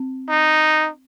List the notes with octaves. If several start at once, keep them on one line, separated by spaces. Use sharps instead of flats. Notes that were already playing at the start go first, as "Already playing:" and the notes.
Already playing: C4
D#4